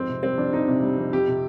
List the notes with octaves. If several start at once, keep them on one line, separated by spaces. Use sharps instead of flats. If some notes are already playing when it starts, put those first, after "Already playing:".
Already playing: F2 G#2 C4
C3
G3 C4
F2 D4
F2 D#4
C3
G3
F2
F2 G4
C3